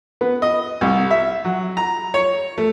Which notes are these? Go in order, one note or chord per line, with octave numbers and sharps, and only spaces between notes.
B3
D#5
C2
E5
F#3
A#5
C#5
A3